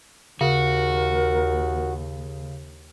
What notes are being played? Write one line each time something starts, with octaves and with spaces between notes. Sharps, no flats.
D#2 C#3 F#4 A#4